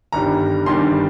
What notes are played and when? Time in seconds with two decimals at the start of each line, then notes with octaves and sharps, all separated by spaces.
0.12 G1 G2 D#3 G3 A#5
0.66 G1 G2 D#3 G3 C6